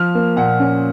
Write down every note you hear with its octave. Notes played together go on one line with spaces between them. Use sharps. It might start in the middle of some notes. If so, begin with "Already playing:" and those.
Already playing: F3 F6
A#3
A#2 F#5
C#4